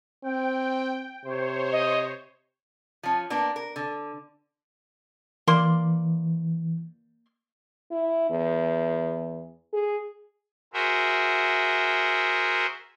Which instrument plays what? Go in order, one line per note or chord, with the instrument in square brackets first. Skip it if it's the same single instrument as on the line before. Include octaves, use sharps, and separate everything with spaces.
[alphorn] C4 [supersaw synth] G5
[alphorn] C3 [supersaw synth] C5 C#5
[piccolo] D#5
[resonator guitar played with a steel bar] F3 C#4
A#3 B3 D4
A#4
D3
[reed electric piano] E3 [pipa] A#3 D5 C6
[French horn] E4
E2
G#4
[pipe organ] F#4 G#4 A#4 C5 E5